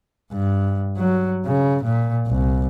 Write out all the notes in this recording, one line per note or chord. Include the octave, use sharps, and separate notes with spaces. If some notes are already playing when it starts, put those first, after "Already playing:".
G2
F#3
C#3
A#2
C2